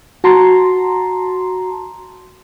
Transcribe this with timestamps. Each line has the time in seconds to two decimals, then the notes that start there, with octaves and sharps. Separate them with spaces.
0.24 F#4 A5 A#5 C6